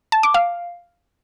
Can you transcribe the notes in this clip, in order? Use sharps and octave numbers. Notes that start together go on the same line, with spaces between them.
A5
D6
F5